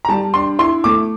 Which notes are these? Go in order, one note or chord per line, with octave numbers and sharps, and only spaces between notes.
A#5
G3 A5
D4 C6
E4 C6
A3 D6